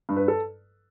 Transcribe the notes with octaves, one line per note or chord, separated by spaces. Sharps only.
G2
B4
A4